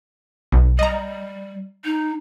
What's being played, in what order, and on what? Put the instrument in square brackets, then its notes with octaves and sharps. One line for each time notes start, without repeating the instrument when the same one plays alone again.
[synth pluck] B1
[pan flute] G3 [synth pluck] D#5 A#5
[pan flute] D#4